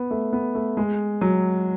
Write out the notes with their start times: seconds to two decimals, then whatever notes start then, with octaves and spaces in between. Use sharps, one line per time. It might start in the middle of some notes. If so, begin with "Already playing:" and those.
Already playing: B3
0.11 A3
0.33 B3
0.55 A3
0.77 G#3
1.21 F#3